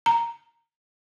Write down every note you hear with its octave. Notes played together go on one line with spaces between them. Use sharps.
A#5